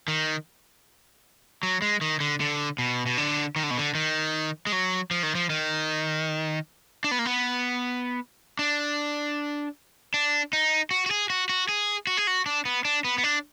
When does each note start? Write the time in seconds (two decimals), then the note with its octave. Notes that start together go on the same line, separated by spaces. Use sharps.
0.08 D#3
1.63 F#3
1.82 G#3
2.01 D#3
2.20 D3
2.40 D3
2.78 B2
3.06 B2
3.18 D3
3.56 D#3
3.63 D3
3.71 B2
3.78 D3
3.95 D#3
4.67 G#3
4.72 F#3
5.11 F3
5.23 D#3
5.35 F3
5.50 D#3
7.04 D4
7.11 B3
7.19 A#3
7.26 B3
8.59 D4
10.14 D4
10.53 D#4
10.91 F#4
11.06 F#4
11.11 G#4
11.30 F#4
11.49 F#4
11.69 G#4
12.07 F#4
12.17 G#4
12.27 F#4
12.46 D4
12.65 B3
12.85 D4
13.04 B3
13.18 B3
13.24 D4